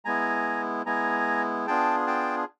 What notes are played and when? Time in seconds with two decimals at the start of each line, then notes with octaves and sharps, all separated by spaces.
0.05 G#3 B3 E4 G#5 A#5
0.86 G#3 B3 E4 G#5 A#5
1.67 B3 D4 F4 G#4 G5 A5
2.07 G5 A5